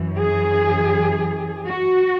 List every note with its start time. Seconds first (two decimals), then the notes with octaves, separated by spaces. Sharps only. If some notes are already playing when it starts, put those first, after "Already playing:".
Already playing: F#2 E3
0.17 G#4
1.68 F#4